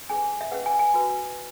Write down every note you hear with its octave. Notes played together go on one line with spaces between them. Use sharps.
C#4 G#4 B4 G#5
E5
C#4 G#4 B4 F#5
G#5
G#5
F#4 B4